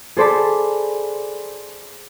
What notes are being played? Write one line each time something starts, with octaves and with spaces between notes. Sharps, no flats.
G#4 A4 C5 D5 A5 B5